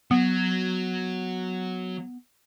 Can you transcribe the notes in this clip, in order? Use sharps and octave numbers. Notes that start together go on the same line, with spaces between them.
F#3 B3